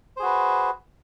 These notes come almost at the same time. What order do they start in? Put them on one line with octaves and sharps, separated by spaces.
C5 G#4 F#4 B4